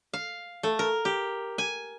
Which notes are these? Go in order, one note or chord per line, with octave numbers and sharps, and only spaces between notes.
F5
A3
A#4
G4
G#5